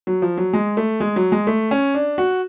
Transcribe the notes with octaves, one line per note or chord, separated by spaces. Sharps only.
F#3
F3
F#3
G#3
A3
G#3
F#3
G#3
A3
C#4
D4
F#4